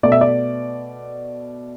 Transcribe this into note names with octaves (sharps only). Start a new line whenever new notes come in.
B2 A3 D5
E5
D5